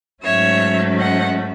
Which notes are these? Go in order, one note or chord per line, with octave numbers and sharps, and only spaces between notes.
G#2 F#3 A3 C#4 C#5 E5
D#5 F#5